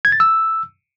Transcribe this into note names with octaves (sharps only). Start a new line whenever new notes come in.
G#6
A6
E6